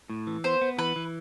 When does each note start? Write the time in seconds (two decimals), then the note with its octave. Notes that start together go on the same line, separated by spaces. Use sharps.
0.10 A2
0.27 E3
0.44 B3 C5
0.61 B3
0.78 E3 B4
0.96 E3